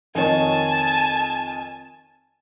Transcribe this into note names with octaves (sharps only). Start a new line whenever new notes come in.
F2 D#3 C#5 G#5 A5